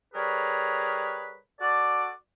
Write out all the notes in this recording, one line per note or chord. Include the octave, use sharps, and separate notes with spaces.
G3 G#4 A#4 B4 C#5
F#4 A4 D5